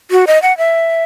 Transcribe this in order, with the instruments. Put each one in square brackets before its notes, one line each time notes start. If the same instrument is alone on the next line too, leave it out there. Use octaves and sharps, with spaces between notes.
[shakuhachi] F#4
D#5
F#5
E5